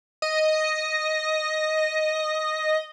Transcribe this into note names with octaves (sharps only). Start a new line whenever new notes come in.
D#5